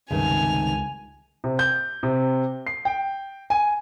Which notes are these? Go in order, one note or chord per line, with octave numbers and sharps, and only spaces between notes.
C#2 G2 C3 D#3 G#5 F7
C3
G6
C3
C7
G5
G#5